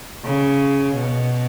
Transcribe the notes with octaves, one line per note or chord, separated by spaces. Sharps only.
C#3
B2